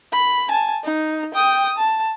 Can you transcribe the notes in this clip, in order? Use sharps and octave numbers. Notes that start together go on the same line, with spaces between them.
B5
G#5 A5
D#4
G5 D#6
A5